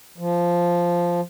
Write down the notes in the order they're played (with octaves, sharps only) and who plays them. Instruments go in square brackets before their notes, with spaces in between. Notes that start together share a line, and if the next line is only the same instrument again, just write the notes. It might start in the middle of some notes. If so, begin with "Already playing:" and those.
[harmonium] F3